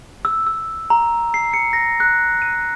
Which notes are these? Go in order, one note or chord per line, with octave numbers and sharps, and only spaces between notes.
E6
E6
A#5
C7
C#7
A#6
F#6
D#7